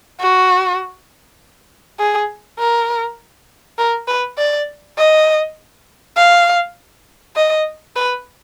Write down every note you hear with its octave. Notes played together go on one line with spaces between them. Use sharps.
F#4
G#4
A#4
A#4
B4
D5
D#5
F5
D#5
B4